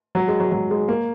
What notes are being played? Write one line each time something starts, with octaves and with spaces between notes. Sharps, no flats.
F#3
G#3
F#3
F#3
G#3
A#3